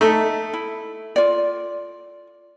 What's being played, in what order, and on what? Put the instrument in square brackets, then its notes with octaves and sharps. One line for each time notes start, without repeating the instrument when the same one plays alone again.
[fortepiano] A3 [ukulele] D#4 A4 E5
[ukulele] E4
F4 D5